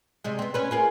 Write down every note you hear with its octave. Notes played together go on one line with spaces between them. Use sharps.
C3 G3 G#3
B3 C4
C#4 B4
F4 G#4 A#4